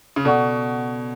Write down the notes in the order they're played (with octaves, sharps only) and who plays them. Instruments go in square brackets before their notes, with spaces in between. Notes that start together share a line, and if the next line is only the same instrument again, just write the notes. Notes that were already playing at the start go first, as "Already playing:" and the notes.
[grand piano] C#3
[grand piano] B2 [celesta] A4 D5 F#5 C#6